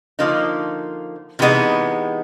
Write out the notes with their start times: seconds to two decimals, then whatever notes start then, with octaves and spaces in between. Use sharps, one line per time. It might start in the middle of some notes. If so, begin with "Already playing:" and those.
0.19 D3 F3 A#3 D#4
1.39 C3 E3 G#3 B3 D#4